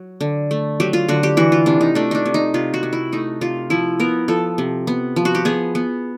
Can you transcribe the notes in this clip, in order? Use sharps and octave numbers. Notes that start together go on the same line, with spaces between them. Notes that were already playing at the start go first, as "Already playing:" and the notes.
Already playing: F#3
D3
A3
F#3 G4
F4
D3 F#4
G4
E3 F#4
F4
C3 D4
D#4
A3 D4
D4 D#4
C3
D#4
C3 F4
F#4
C3
E4
A3 D#4
C3 F4
F3 E4
B3 A#4
F3 A4
C3
B3
F3
F#4
G4
B3 G#4
B3